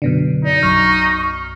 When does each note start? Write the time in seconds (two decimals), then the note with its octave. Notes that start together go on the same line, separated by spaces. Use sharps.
0.02 F#2 B2 D3
0.45 D#4 D5
0.63 B1 F#2 C#6 F6